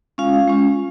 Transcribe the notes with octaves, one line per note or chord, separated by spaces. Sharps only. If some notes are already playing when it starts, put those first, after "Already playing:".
G#3 C#4 F4 F5
G#3 C#4 F4